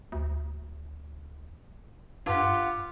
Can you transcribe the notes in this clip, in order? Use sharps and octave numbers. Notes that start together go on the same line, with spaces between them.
D2
G2 F4 G4 F#5